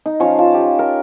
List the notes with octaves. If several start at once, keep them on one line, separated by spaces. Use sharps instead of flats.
D#4
F3 C#4 C#5 F5
F4 A5
G4
A#4